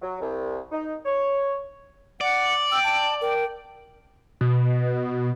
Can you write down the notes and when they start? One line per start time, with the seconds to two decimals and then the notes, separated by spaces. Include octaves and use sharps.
0.02 F#3
0.21 C2
0.72 D#4
1.06 C#5
2.21 D5 F#5
2.72 G5 E6
2.84 A5
3.21 A#4 G5
4.41 B2